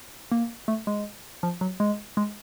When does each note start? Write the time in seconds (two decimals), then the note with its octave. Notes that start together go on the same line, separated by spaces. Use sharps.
0.32 A#3
0.68 A3
0.87 G#3
1.43 F3
1.61 F#3
1.80 G#3
2.17 G#3